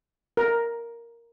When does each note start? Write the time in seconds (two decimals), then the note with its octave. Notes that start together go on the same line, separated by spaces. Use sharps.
0.37 A#4